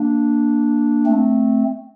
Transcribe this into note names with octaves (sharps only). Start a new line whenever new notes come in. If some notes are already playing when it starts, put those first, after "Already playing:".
Already playing: A#3 D4
A3 C4